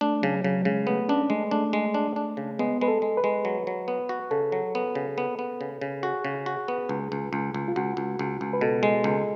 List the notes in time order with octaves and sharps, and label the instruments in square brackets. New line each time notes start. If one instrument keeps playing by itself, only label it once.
[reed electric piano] A3 [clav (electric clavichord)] D4
[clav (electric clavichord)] C#3 [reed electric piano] F#3
[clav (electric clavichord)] C#3 [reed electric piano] F#3
[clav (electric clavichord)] C#3 [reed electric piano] G#3
[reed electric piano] A3 [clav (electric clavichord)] B3
[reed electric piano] C#4 [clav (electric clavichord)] D4
[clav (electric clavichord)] G#3 [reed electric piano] A3
[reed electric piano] A3 [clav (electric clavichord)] D4
[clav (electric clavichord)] G#3
D4
D4
C#3
[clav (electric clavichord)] G#3 [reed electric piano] B3
[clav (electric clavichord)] G#3 [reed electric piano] B4
[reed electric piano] A4
[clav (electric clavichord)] G#3
[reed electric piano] B4
[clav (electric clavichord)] G#3
F#3
F#3
B3
F#4
[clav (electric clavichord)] C#3 [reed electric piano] A4
[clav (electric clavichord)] F#3
B3
C#3
B3
B3
C#3
C#3
[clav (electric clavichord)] F#4 [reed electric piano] G#4
[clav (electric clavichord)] C#3
F#4
B3
C#2
C#2
C#2
C#2
[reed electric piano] F4
[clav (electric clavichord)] C#2 [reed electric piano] F#4
[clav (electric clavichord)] C#2
C#2
C#2
[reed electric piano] B4
[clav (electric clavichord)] B2 [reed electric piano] A4
[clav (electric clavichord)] G#3
C#2